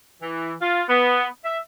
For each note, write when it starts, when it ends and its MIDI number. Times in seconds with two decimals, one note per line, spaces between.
0.21 0.53 52
0.62 0.82 65
0.89 1.27 59
1.45 1.58 76